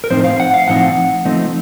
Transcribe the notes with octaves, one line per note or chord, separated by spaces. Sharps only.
A#4
A2 F3 C4 D#4 C5
F5
F#5
F5
A2 F3 C4 D#4 F#5
F3 A3 C4 D#4